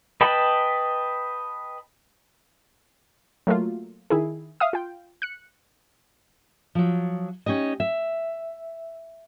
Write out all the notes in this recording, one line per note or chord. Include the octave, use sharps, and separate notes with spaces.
B4 D#5 G5 A5 B5
F#3 A3 A#3 F4
D#3 E4 G#4
E5 F5 D#6
F4 G5
F#6 C#7
F3 F#3
C#4 D#4 G4 D#5
E5